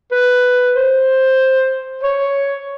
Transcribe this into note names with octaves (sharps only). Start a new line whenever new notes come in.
B4
C5
C#5